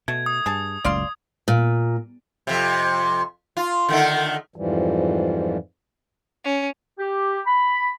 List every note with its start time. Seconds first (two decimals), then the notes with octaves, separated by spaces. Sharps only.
0.08 B2 A3 G#6
0.26 D#6
0.46 G2 G#4 A5
0.85 F#1 C#2 A2 D5 F5 C6
1.48 A#2
2.47 F2 C3
3.57 F4
3.89 D3 D#3 A3
4.56 F2 G#2 E3 F3 G3
6.44 C#4
6.98 G4
7.45 B5